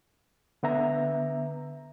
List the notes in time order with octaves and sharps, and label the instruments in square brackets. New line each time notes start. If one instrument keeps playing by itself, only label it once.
[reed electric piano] D3 B3 E5 A#5